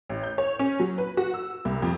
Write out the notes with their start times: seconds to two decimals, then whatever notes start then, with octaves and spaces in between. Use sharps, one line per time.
0.10 A1
0.23 G6
0.38 C#5
0.59 C#4
0.80 F#3
0.98 B4
1.17 F#4
1.34 E6
1.65 C2
1.82 F2